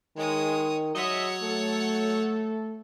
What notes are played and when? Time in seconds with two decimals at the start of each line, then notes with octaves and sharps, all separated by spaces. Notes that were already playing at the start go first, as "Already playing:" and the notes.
0.17 D#3 G#3 C#5 D#6
0.95 F#3 G#3 C#5 D#5 E5 F#5
1.43 A3 A4